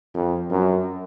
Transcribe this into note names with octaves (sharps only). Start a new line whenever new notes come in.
F2
F#2